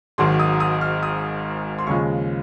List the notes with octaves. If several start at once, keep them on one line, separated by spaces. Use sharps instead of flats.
G#1 G#2 D#3 F#3 C6
D#6
D#6
F6
D#6
C6
D#2 C#3 F3 G#3 C#6